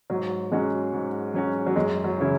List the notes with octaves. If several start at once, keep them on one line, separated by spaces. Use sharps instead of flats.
G#2 F#3
F#3 G#3 C#4 F#4
G#2
F#3 C#4 F#4
F#3
F#2 G#3
F#3
C#3 E3 C#4 E4